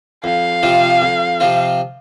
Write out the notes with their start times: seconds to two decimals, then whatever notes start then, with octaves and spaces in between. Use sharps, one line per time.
0.24 F2 F5
0.63 C3 F3 C4 F4
1.02 F2
1.40 C3 F3 C4 F4